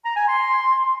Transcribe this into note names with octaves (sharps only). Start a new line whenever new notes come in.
A#5
G#5
C6